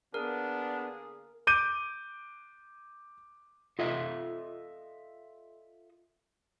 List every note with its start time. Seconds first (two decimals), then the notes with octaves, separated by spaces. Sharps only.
0.14 D3 A#3 B3 D4 G#4 A#4
1.47 D6 G6 D#7
3.79 F4 A4 D#5 E5